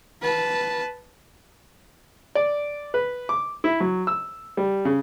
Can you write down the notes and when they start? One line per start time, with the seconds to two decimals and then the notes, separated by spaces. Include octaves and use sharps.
0.22 B4 A5
2.35 D5
2.94 B4
3.29 D6
3.64 E4
3.80 F#3
4.07 E6
4.57 G3
4.85 C#3